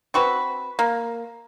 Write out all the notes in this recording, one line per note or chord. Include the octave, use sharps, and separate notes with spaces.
C4 F#4 B4
A#3